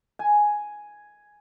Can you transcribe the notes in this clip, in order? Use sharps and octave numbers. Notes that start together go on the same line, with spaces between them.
G#5